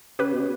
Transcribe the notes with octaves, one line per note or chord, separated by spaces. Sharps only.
C#3 G4 B4
B2
C#3